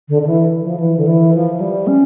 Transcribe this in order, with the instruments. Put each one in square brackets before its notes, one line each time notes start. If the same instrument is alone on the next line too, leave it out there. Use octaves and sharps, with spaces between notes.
[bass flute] D3
D3
E3
F3
E3
D3
E3
F3
G3
C#4